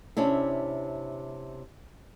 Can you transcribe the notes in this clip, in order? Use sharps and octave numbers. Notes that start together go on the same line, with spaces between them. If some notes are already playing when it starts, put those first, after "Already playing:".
C3 C#4 D4 E4